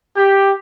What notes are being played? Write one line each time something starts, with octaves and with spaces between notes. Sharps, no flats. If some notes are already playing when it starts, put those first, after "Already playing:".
G4